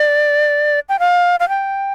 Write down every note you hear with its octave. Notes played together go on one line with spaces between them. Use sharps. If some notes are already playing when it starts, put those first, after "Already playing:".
Already playing: D5
G5
F5
F5
G5